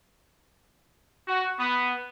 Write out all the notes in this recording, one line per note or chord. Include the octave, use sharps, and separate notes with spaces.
F#4
B3